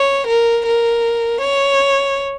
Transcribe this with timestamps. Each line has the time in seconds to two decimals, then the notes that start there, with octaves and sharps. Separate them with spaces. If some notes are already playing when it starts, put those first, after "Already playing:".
Already playing: C#5
0.27 A#4
0.66 A#4
1.41 C#5